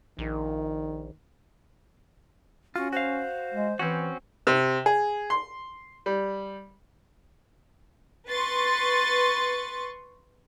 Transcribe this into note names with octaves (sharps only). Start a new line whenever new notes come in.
A#1 D#3
C#4 F4 F#4
F#4 C5 F5
G#3
E3 C4 C#4 F#4
C3
G#4
C6
G3
B4 C6 C#6 A6